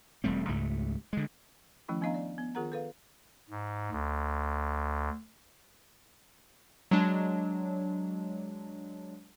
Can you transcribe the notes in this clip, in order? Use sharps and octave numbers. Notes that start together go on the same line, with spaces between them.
E1 G3 A3 C4
C#2 G#2 A3
D3 G#3
D#3 F3 A3 C#4 E4
F3 B3 D4 D#5 F5 A#5
D5
B3
D#3 F4 G#4 A#4 F#5 A#5
A4 B4 F5
G#2
D2
F#3 G#3 D4